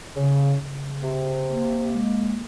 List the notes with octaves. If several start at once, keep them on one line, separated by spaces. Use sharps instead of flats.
C#3
C#3
C3
A#3
G#3